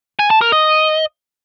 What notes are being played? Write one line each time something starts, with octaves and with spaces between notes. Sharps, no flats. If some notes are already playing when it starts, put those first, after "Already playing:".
G#5
A5
A#4
D#5